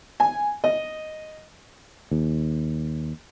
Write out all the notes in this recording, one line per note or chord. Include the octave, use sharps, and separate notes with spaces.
G#5
D#5
D#2